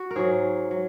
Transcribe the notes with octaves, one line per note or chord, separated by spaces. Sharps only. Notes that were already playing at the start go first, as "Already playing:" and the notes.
Already playing: F#4
A#4
G#2 F#3 G#4
F#3